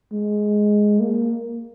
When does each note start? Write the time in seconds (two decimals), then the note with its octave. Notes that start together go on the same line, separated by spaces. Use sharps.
0.13 G#3
1.00 A#3